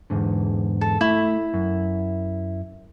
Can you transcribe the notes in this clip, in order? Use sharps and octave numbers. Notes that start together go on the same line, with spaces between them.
E2 G#2 D3
A4
A3 E4
F#2